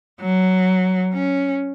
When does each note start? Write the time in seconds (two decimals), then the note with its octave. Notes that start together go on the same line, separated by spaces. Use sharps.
0.21 F#3
1.13 C#4